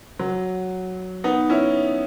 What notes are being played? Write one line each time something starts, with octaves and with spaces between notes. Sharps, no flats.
F#3
B3 D#4
C#4 E4